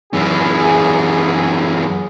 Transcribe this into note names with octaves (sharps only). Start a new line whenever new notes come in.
F#2 E3 G#4